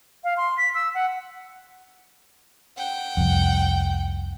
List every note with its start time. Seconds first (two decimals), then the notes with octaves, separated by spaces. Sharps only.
0.24 F5
0.37 C6
0.58 B6
0.74 E6
0.95 F#5
2.77 F#5 G5
3.17 C2 F2